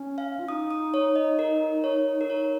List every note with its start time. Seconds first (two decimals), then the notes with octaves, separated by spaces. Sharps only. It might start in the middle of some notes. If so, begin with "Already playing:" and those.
Already playing: C#4
0.18 F5
0.39 F4
0.48 D#4 D#6
0.71 D#6
0.94 C#5
1.16 D#5
1.39 A#4
1.84 C#5
2.21 A#4
2.29 D#4 C#5